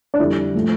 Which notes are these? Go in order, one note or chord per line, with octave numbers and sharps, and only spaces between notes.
D4
F2 D3 G3 E4
A2 F3